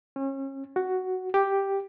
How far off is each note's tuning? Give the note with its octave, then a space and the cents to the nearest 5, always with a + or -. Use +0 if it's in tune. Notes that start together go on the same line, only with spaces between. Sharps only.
C#4 -35
F#4 +5
G4 +0